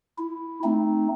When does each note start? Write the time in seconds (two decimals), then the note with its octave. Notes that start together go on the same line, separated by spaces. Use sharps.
0.18 E4
0.64 A3 C4 D#4